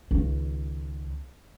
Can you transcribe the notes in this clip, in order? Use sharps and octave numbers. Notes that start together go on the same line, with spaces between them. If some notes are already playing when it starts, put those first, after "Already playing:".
C#2 D#3